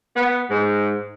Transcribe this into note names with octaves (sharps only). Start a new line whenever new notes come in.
B3
G#2